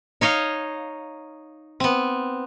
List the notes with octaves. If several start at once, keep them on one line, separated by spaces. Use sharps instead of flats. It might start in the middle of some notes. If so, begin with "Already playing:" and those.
D#4 C#5 D#5 F5
B3 C4